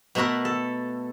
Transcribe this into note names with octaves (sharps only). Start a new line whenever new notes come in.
B2 A3 B3 A#4 F#5
A4